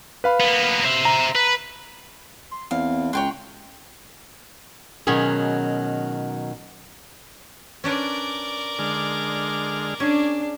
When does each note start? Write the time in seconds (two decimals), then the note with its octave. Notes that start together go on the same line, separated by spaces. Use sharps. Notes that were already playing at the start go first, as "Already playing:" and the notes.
0.24 B4 F5 B5
0.40 A#3 B3
0.85 C5 E5
1.05 A#5
1.35 B4
2.51 C6
2.71 E2 C4 F5
3.13 C#2 C#5 G5 C6 F#6
5.07 B2 D#3 F#3 C#4 G#4
7.84 C#4 D4 A#4 B4 D5
8.79 D3 G#3 F6
10.00 C#4 D4 G#4